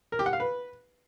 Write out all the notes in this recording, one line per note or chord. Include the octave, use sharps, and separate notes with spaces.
A#4
G4
F#5
F5
B4